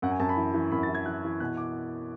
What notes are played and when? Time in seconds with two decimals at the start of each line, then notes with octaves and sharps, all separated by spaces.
0.02 F#2 F#5
0.11 G#5
0.20 F#2 A5
0.29 B5
0.37 E3
0.54 E3
0.72 F#2 B5
0.83 A6
0.89 E3
0.95 G#6
1.06 E3 F#6
1.24 E3
1.40 B2 F#6
1.57 D6